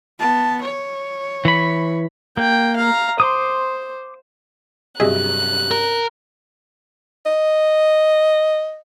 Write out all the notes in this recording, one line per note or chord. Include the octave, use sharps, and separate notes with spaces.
B3 A5
C#5
E3 B5
A#3 G5
F5 A#5
C5 C6 D6 D#6
G2 C3 F#3 G#4 D#5 E5 F#6
A#4
D#5